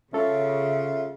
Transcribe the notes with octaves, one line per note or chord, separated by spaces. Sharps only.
C#3 C#4 F4 A4 C#5 E5